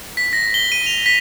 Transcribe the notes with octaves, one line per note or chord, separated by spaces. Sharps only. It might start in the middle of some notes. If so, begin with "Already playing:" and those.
B6
A#6
G7
D#7
F7
B6